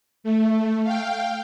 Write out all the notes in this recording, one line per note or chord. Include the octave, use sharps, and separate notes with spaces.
A3
F5 G5